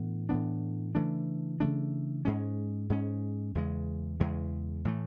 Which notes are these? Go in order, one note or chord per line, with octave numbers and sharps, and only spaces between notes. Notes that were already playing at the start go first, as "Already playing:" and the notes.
Already playing: A2 E3 B3 D4
A2 E3 B3 D4
C#3 E3 A3 D4
C#3 E3 A3 D4
G#2 G#3 C#4
G#2 G#3 C#4
E2 C#3 G#3
E2 C#3 G#3
A2 E3 A3